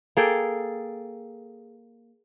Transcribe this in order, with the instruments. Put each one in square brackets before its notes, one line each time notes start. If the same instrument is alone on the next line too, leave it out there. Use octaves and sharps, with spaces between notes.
[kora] A#3 G#4 A4 G5